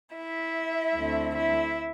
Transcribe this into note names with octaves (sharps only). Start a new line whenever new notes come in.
E4 E5
D2 D3 A3 C4
E4 E5